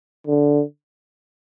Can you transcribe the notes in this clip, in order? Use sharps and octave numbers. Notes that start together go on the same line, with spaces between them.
D3